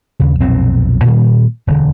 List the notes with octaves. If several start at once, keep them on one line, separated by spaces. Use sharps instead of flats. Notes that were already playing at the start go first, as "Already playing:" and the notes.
D#2 C#3
B1 F2 A#2 C4
A#2 D#3 G3
E1 D2 D3